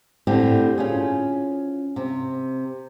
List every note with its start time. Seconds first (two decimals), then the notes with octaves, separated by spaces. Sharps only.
0.27 A2 D3 C4 G4
0.78 C#4 F4 G#4
1.96 C3